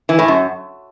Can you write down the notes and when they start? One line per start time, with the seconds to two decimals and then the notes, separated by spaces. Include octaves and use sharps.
0.09 E3
0.19 A2
0.28 F#2